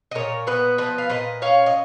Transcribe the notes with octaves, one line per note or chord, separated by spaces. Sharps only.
D#5
A#2 A#4 C#5
B3 B4 D#5
F3 B4 D#5
F5
A#2 B4 D#5
C#4 C#5 F5
D#5